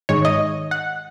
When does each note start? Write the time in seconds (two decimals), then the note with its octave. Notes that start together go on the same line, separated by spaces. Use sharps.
0.09 G#2 D#3 G#3 C#5
0.25 D#5
0.71 F#5